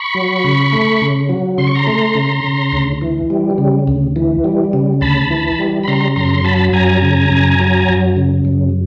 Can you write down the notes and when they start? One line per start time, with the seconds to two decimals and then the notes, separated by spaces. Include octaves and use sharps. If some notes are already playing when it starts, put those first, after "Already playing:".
Already playing: B5 C#6
0.14 F#3
0.44 C#3
0.72 A3
1.02 C#3
1.29 F#3
1.58 C#3 C6
1.67 C#6
1.75 A#5 C6
1.87 A3
2.15 C#3
2.44 C#3
2.72 D2
3.01 E3
3.30 G3
3.58 C#3
3.87 D2
4.16 E3
4.44 G3
4.73 C#3
5.01 D2 A5 B5
5.30 E3
5.59 G3
5.84 B5
5.88 C#3 A#5 C6
6.16 F#2 A#5 C6
6.34 C6
6.44 F#3 A5 B5
6.73 F#2 G#5 A#5
7.02 C#3
7.31 F#2
7.60 F#3
7.89 F#2
8.17 C#3
8.45 F#2